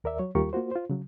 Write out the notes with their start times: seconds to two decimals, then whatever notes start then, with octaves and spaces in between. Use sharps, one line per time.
0.04 D#2 A#4 D5 E5
0.19 F#3 C#5
0.35 D#2 G3 F4 G4 A#4 C#6
0.53 A#3 F4 F#4 C5
0.71 F4 C5
0.90 C#3 F#3